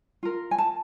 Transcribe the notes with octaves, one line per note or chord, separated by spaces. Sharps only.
F4 A#4
G#5
A5